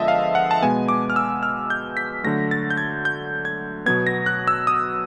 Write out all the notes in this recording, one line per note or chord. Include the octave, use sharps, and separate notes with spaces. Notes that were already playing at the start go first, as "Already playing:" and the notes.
Already playing: D3 F3 G#3 B3 D#5 E5 A5
F5
F#5
A5
B2 G#3 B3 G#5
D6
F6
E6
F6
G6
B6
D3 F#3 A3 A#6
A6
G6
G#6
G6
G#6
B2 F#3 B3 G#6
A#6
F#6
E6
D#6